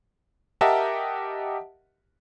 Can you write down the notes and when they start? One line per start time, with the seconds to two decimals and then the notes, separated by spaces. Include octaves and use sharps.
0.61 G4 A#4 D#5 E5 F#5 A5